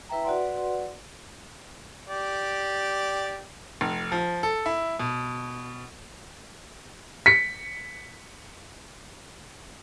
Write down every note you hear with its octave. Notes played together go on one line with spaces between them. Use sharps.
E4 B4 E5 G5 A#5
F#4 B4 D5 F#5 C6
G4 D5
F1
F3
A4
E4
B2
B6 C#7